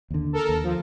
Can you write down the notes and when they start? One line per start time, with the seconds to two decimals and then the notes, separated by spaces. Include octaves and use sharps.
0.10 D#2 D3
0.33 A4 A#4
0.49 D#2
0.64 F3